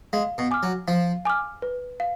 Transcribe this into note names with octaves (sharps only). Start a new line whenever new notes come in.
G#3 F5
B2
G#5 D6 F6
F#3
F3 F5
G#5 D6 F6
B4
F5